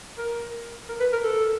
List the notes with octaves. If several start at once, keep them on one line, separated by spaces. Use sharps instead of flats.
A#4
A#4
B4
A#4
A4